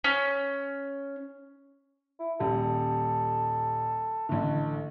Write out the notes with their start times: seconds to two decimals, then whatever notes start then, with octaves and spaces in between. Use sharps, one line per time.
0.04 C#4
2.20 E4
2.40 D#1 G3 A4
4.29 A1 D3 A3